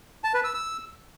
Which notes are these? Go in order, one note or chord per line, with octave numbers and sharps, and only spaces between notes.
A5
B4
E6
E6